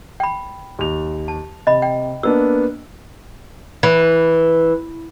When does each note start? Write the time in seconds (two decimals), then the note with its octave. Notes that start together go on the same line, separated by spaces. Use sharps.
0.20 G5 B5
0.79 D#2 F7
1.28 A5
1.67 C3 D#5 B5
1.82 G5
2.23 A#3 B3 D4 E6
3.83 E3